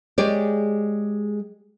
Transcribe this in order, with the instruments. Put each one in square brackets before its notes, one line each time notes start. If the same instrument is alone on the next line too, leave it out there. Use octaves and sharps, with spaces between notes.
[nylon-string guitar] G#3 G4 G#4 C#5 D5